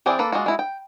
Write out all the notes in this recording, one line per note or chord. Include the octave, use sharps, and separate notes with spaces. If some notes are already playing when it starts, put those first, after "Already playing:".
E3 C4 G#4 C5 D5
A#3 A4 B4
G#3 A#3 F4 F#4
G#3 E4 F#4
G5